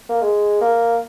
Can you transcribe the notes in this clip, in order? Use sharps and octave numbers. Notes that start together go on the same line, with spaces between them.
A#3
G#3
A#3